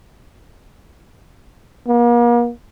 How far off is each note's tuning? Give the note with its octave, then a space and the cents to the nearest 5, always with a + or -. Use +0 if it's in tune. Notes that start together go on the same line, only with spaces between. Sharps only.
A#3 +40